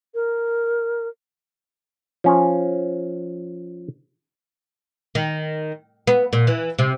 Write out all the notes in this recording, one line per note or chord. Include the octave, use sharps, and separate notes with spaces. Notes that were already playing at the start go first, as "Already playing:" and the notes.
A#4
F3 C#4
D#3
B3
A#2
E3
C3